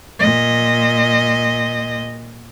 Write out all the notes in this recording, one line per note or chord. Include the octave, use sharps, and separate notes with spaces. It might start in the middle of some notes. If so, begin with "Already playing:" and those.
A#2 D#5